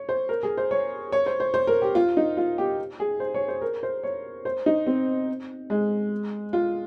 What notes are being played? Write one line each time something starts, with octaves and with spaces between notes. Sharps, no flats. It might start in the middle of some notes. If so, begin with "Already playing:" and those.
Already playing: C#5
C5
A#4
G#4
C5
C#5
C#5
C5
C5
C5
A#4
G4
F4
D#4
F4
G4
G#4
C5
C#5
C5
A#4
C5
C#5
C5
D#4
C4
G#3
F4